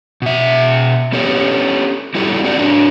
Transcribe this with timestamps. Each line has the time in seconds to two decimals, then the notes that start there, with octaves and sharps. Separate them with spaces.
0.22 B2 E5
1.12 B3 C#4 G4 A4 C#5
2.15 F#3 G3 E4 G4 A4
2.44 C4 F#4 A4 D5
2.57 F#3 D4